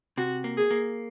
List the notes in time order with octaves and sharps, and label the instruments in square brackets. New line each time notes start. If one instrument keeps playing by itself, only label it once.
[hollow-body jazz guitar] C3 [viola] F#4
[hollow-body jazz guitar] A#3
[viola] G#4
[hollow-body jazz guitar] A#3